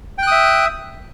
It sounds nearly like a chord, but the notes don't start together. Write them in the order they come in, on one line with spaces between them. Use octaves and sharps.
G5 F#6 D#6 E5